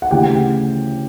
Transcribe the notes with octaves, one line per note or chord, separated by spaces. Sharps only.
F#5
D2 C#3 E3 G4 G5